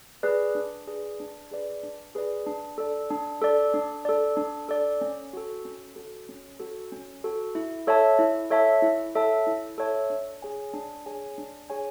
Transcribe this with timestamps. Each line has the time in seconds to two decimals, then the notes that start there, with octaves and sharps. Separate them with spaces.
0.23 G#4 B4 D5
0.55 D4
0.87 G#4 B4 D5
1.20 D4
1.51 G#4 B4 D5
1.83 D4
2.15 G#4 B4 D5
2.46 D4
2.78 A4 D5
3.11 D4
3.42 A4 D5
3.74 D4
4.05 A4 D5
4.37 D4
4.69 A4 D5
5.01 C#4
5.33 F#4 A4
5.65 C#4
5.96 F#4 A4
6.29 C#4
6.60 F#4 A4
6.92 C#4
7.24 F#4 A4
7.55 E4
7.87 A4 C#5 E5 A5
8.19 E4
8.50 A4 C#5 E5 A5
8.82 E4
9.15 A4 C#5 E5 A5
9.47 E4
9.78 A4 C#5 E5 A5
10.10 D4
10.42 G#4 C#5 G#5
10.73 D4
11.06 G#4 C#5 G#5
11.38 D4
11.70 G#4 C#5 G#5